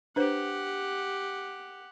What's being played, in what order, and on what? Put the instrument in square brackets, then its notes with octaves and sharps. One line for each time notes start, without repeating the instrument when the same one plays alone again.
[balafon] D4 B4 C5 [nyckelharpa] G4 F#5